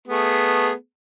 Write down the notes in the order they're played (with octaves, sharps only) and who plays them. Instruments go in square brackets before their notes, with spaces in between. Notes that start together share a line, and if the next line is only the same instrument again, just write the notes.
[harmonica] A3 B3 G#4